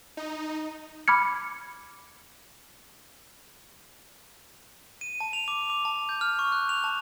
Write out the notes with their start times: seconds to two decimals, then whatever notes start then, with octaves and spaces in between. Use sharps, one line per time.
0.17 D#4
1.08 B5 D6 F6 G#6 C#7
5.01 D#7
5.20 A5
5.33 F7
5.48 D6
5.70 D6
5.85 A5
6.09 G6
6.21 F6
6.39 C#6
6.52 F#6
6.69 F7
6.84 A5